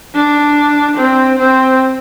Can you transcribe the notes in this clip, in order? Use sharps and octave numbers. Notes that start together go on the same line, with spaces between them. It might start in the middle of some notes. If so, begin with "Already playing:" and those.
D4
C4
C4